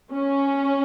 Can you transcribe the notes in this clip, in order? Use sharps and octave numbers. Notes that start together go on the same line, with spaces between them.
C#4